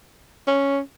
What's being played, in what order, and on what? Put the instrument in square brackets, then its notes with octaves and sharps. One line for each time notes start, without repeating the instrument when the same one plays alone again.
[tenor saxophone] C#4